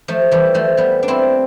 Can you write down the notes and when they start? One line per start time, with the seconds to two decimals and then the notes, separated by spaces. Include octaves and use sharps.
0.08 F3 A3
0.31 E3 G3
0.54 F3 A3
0.77 G3 B3
1.03 D4
1.08 C4 E4